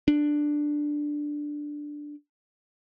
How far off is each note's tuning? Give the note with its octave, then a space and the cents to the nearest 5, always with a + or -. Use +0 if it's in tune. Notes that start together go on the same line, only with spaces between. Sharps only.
D4 +5